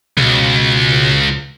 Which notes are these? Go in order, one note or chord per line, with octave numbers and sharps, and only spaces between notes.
C#2 B2